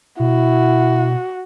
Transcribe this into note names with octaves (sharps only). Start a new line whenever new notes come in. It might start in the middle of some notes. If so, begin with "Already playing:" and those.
B2 E4 F#4